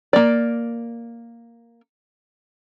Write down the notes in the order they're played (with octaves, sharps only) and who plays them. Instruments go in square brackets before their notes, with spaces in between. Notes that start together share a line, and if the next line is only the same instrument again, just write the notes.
[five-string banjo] A#3 D5